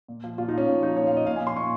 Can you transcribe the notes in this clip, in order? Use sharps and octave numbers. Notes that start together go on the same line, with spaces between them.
A#2
F3
A#2 F4
D#4
F3 C#4
A#2
F3 D#4
A#2 C#5
F5
F3 D#5
A#2 F5
G#5
F3
C6
A#2 C#6